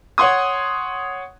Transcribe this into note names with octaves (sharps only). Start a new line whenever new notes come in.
C#5 F#5 C6 D#6